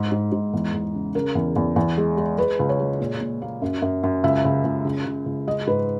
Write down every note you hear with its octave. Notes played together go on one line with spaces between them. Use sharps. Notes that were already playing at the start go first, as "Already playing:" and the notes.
Already playing: G#2
G#2
G#2
E2
E2
C#3
C#3 A#4
E2
E2
E2
G#3
G#3
G#3 B4
C#2
C#5
G#3
A#2
A#2
A#3
F#2
F#2
F#2
C#2 E5
C#2
C#2
C#3
C#3
C#2
G#3 D#5
G#2 B4